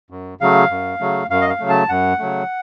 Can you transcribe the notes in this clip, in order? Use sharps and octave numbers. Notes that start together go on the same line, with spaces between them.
F#2
C#3 F#3 A3 F5
F#2
C#3 F#3 A3
F#2 F5
D#5
F5
C#3 F#3 A3
A5
F#2 F#5
C#3 F#3 A3